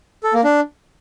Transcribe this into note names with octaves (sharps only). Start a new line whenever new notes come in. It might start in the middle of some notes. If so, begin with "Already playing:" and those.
A4
A#3
D4